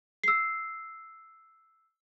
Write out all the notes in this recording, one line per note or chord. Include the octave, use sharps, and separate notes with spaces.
E6 C7